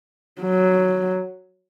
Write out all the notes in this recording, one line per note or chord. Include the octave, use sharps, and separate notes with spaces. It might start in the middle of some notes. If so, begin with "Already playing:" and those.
F#3